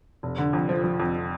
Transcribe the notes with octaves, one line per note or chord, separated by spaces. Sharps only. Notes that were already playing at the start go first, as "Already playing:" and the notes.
F1
D3
F2
F3
F3
F2